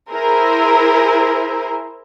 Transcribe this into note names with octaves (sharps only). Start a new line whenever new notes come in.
E4 G#4 A#4 C5